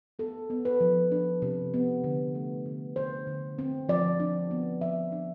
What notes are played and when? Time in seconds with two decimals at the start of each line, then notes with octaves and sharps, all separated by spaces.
0.19 B3 A4
0.50 B3
0.65 B4
0.80 F3
1.12 D4
1.42 C3
1.74 B3
2.04 D3
2.35 A3
2.66 D3
2.96 D3 C5
3.27 D3
3.58 C4
3.89 F3 D5
4.20 D4
4.51 B3
4.81 F3 E5
5.12 D4